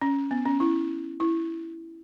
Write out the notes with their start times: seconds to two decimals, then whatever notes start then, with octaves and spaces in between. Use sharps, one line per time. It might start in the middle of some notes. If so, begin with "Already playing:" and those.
0.01 C#4
0.31 B3
0.45 C#4
0.60 E4
1.20 E4